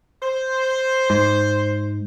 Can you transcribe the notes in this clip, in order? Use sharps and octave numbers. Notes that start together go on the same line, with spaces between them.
C5
G#2